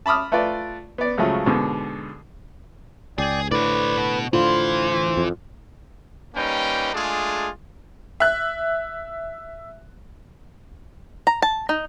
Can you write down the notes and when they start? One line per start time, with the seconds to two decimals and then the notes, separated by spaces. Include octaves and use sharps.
0.06 A5 B5 D6 D#6 F6
0.32 A3 F4 B4 D5
0.98 B3 D5
1.18 C#2 C#3 F3 F#3 A3
1.46 G#2 B2 D3
3.18 C#2 G#4 D5 G5
3.51 A2 D3 B4 C5 D5
3.98 B2
4.33 A2 D3 E3 F4 C5
5.17 F2
6.35 G3 A#3 C#4 D#4 B4 G5
6.94 G#3 A3 D4 F4 G#4
8.20 E5 F#6
11.27 A#5
11.42 A5
11.69 D#4